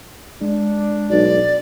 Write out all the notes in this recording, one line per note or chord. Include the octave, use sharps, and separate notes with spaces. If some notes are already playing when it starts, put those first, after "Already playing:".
G#3 D4
B1 D5